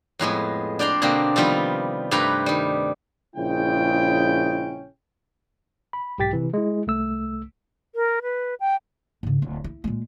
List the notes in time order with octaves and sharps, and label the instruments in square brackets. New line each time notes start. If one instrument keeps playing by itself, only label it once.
[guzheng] F2 A2 G#3 B3
D4 D5 G5 A#5 C6
B2 D3 A#3 C4 G4
C3 D#3 F3 G3 B3 F4
G2 C3 A3 G4 B4 A#5
D#3 G3
[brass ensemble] A#1 C#3 G#3 C#4 E4 G5
[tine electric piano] B5
B1 G#2 G4 G5 A6 B6
C3 E3
G#3 E4
C2 A3 E6
[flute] A#4
B4
G5
[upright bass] G#2 C#3
D1
E4
A#2 G#3